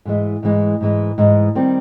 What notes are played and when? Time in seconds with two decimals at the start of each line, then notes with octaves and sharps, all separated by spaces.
0.05 G#2 E3 G#3
0.43 G#2 E3 G#3
0.81 G#2 E3 G#3
1.18 G#2 E3 G#3
1.55 D#3 G3 C4